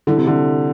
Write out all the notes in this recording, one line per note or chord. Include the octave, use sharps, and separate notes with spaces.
D3 G3 E4 A4
C3
D3